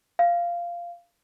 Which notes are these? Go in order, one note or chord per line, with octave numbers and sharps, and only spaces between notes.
F5